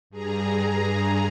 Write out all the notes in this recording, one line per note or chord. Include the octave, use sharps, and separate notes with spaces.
G2 G#4 A#5